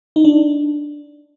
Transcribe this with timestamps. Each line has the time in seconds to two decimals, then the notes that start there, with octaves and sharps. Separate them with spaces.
0.16 D#4
0.24 D4